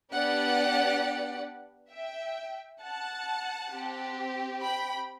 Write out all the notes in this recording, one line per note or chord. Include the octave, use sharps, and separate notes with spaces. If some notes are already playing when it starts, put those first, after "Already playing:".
B3 D4 G4 D5 F#5
E5 G5
F#5 A5
C4 G4
G5 B5